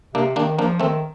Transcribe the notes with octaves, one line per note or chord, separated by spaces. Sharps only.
C3 A#3 D4
D#3 A#3 D4
F3 A#3 D4
D#3 A3 C4